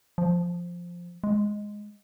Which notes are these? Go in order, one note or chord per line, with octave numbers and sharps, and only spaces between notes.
F3
G#3